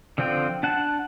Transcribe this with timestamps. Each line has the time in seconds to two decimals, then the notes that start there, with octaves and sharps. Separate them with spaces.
0.18 D3 F3 C4 F4 G5
0.63 D4 F#5 A5